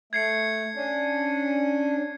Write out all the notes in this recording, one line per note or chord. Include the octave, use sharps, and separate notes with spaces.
A3 G#6 C7 C#7
C#4 D4